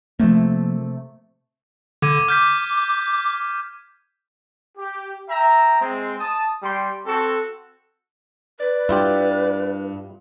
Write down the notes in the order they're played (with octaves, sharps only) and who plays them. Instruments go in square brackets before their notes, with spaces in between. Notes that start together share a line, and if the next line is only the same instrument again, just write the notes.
[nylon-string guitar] C3 A3 E5 [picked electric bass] F3 A#3
[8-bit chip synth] D3 [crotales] D6 G#6 D#7
[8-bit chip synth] D6 [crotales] F6 G6 B6
[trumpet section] G4
E5 G5 A#5
G#3 C4
A5 D#6
G3 G5 C6
C4 F#4 A4
[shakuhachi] B4 [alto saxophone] D5
[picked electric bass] G2 [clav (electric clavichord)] E4 F4 G4